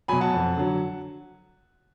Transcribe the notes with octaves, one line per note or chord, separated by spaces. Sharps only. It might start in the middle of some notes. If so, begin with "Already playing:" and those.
B2 F#3 G#5 B5
F#5 A5
F2
D3 F#3